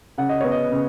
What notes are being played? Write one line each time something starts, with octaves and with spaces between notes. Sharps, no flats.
C#3 F#5
D#5
B3 C#5
D#5
C#3